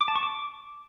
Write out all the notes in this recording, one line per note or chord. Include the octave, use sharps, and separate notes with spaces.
D6
A5
C#6
D6